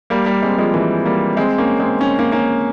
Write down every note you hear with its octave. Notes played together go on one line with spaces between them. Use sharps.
G3 A#3
G3 A#3
G#3 C4
F3 G#3
E3 G3
G3 A#3
G#3 C4
A#3 C#4
G#3 C4
C#4
A#3 C#4
A#3 C#4